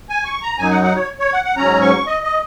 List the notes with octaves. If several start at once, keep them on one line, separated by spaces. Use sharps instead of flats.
G#5
C#6
A#5
F#2 F#3 D#4 G#5
F#5
F#5
C#5
C#5
F#5
F#5
G#2 F#3 C#4 A#5
C#6
D#5
D#5